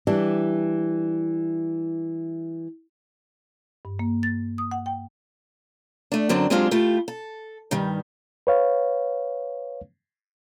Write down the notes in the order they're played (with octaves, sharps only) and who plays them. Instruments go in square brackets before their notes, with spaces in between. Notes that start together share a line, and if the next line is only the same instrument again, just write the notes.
[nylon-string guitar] E3 G3 D4
[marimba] G2
A#3
A6
D#6
F#5
G5
[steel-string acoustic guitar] A3 D4
F#2 D3 F#3 C4 D4
F#3 G#3 C4 D4 F4 G4
A3 E4 F4 G4
A4
G2 D#3 G3
[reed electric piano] B4 C#5 F5